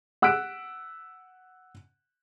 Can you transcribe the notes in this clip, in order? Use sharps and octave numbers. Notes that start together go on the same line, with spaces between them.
F#5 E6 F#6 B6 D7